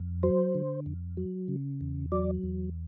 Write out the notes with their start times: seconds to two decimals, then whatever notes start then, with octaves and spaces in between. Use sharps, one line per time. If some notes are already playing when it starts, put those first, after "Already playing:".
Already playing: F2
0.23 F#3 C5
0.55 D3
0.86 F2
1.17 F#3
1.48 C#3
1.81 E2
2.12 F#3 D5
2.43 E2